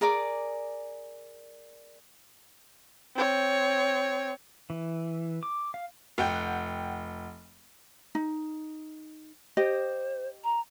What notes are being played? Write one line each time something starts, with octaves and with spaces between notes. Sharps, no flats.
G#4 A#4 D5 D6
C4 C#5
E3
D6
F5
F1 F#5 G5
D#4
G4 C5 D#5
A#5